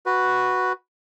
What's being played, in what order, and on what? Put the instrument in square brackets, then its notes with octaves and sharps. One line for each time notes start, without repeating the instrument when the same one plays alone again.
[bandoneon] F#4 B4